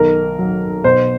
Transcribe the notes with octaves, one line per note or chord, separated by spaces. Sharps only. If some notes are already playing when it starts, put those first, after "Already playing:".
Already playing: B1 D#3 A#4
F#3
B2 C5